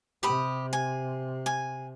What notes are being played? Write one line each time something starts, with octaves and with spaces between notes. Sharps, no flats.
C3 G4 B5 D#6
G#5
G#5